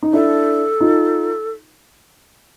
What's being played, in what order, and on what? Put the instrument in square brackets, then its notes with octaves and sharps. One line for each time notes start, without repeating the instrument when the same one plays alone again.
[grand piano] D#4
[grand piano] D4 E4 [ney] A4
[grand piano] D#4 F4